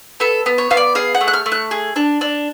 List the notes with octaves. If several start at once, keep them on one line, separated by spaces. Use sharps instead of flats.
B3 A4
B3
C#5
B3 F5
D5
G#4 F5
F#5
A3
F#6
F6
A3
F#6
G#4
D4
D4